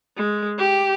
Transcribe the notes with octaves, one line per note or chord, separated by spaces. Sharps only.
G#3
G4